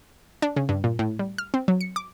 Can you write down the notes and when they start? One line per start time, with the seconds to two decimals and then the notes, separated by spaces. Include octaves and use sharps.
0.42 D4
0.56 C#3
0.69 G2
0.84 A#2
0.99 A2
1.19 G3
1.38 F6
1.54 C4
1.68 F#3
1.81 C#7
1.96 D6